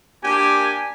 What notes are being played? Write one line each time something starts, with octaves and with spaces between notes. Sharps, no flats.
A#3 D4 G4 G#5